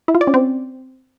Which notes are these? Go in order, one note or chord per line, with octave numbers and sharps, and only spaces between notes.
E4
F4
D5
C#4
C4